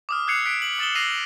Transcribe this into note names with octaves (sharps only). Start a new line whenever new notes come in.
D6 D#6 F6
E6 F#6 G#6 C7 C#7 F7
F#6 B6 C7 D7
F#7
D#6 A6 E7 F#7 G7
E6 A#6 C7 C#7 D#7 F7